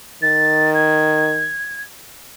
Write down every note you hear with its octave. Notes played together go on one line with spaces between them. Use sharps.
D#3 A6
G#6